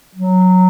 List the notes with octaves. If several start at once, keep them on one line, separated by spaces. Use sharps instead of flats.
F#3